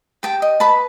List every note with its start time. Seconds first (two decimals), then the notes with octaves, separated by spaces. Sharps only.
0.23 G4 G5 A5
0.42 D#5
0.60 B4 A5 B5